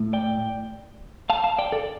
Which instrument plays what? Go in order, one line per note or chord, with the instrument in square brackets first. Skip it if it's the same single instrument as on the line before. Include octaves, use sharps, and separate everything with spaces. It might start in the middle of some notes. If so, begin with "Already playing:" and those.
Already playing: [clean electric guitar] A2 A3
D5 G5
F5 A5
F5 A5
D5 G5
A4 D5